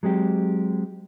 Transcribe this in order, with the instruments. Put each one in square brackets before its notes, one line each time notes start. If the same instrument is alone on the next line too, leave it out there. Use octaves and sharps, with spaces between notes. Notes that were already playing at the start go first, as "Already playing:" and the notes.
[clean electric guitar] F#3 G#3 C4 G4